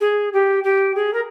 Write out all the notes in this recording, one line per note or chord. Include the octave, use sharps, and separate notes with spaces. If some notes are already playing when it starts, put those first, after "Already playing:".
G#4
G4
G4
G#4
A#4